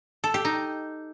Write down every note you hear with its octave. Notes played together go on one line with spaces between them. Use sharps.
A4
G4
D#4